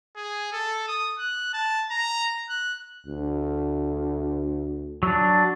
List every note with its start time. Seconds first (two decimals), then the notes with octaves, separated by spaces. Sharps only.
0.16 G#4
0.53 A4
0.88 D#6
1.19 F#6
1.53 A5
1.91 A#5
2.49 F#6
3.07 D2
5.03 F#3 D4